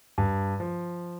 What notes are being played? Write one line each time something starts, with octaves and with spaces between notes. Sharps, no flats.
G2
F3